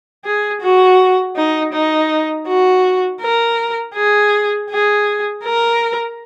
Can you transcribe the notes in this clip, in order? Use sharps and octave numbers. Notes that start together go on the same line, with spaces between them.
G#4
F#4
D#4
D#4
F#4
A#4
G#4
G#4
A#4